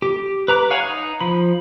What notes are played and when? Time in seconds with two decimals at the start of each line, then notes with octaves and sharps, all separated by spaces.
0.02 G4
0.48 B4 A#5 D6
0.70 C#5 F5 F#5 G#5
0.83 D#4
1.20 F3 B5